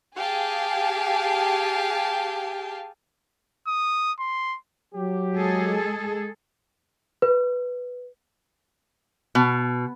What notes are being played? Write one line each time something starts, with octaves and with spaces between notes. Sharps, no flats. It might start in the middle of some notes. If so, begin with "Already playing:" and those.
G4 G#4 F5 G#5 A5
D#6
C6
F#3 G4
G#3 G#4 A4
B4
B2